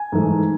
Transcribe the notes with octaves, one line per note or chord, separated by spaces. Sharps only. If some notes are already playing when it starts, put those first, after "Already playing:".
Already playing: G#5
G#2 E3 A3